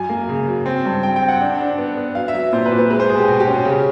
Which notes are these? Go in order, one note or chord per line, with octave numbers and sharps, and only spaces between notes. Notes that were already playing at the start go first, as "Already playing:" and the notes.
Already playing: F#2 G#5
A#3
C#3
F#3
C4
G2
C4 G5
G5
C4
F#5
D4
D4
B3
B3
F#3 F5
E5
F#3
A#2 C5
B4
A#2
B4
G#3 B4
C5
B2 G#4
G4
B2 F#4
G4
C#4
F#4
C#3